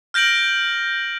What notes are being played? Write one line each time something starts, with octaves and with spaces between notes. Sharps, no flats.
F6 G6 A#6 D7 F#7